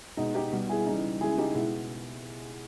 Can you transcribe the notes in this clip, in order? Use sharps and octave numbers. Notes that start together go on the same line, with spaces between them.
B2 G#3 D#4
D#4 G4
B2 G3
E4 G#4
C#3 E3 G3 D#4
C#3 G#3 E4 G#4
D#4 G4
B2 G#3 E4